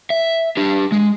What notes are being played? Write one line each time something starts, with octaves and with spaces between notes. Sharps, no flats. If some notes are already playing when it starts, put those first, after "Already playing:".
E5
D4 G4
G#3